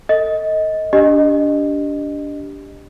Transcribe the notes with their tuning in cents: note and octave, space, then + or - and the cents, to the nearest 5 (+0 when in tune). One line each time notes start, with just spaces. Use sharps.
A4 +30 D#5 +20
D4 -20 G4 +0 D#5 -20